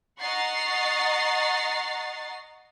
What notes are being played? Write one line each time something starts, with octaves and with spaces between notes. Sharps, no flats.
D#5 F#5 A#5 C#6 A6 C7